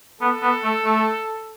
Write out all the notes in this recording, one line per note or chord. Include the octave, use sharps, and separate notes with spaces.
B3 A4
B3
A3
A3